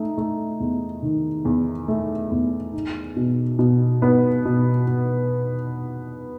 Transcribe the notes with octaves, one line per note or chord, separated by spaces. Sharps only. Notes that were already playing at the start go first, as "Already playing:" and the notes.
Already playing: A3 D#4
A3
E2
D#3
E2
A3
E2
D#4
B2
B2
B3
B2
B2